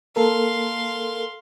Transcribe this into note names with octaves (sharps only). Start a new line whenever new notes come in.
A#3 A4 A#4 F5 C6